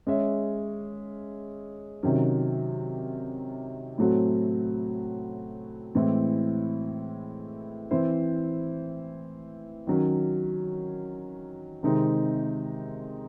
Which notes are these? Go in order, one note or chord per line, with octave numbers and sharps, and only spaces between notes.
G#3 C#4 G#4 C#5 E5
C3 D#3 F#3 C#4
A2 F#3 A3 C4 F#4
A2 E3 G#3 C4 E4
E3 C4 E4 C5
D#3 F#3 C#4
C3 D#3 G#3 C4 D#4